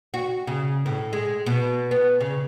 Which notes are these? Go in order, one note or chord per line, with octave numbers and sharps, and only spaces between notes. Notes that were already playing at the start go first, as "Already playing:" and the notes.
F#4
C#3
A2
G#3
B2
B3
C#3